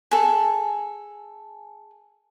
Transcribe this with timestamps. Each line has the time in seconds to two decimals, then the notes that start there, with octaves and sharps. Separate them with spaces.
0.11 G#4 A4